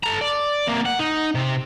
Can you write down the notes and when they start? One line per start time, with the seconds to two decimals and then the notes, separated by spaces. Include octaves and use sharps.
0.04 A4 A#5
0.21 D5
0.67 C3 A#3
0.85 F#5
0.99 D#4
1.35 C3